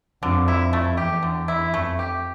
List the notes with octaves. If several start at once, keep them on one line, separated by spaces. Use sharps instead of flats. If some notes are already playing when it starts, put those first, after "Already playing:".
F2 D3
E4
A3
E2 G4
D3
E4
F2 A3
G4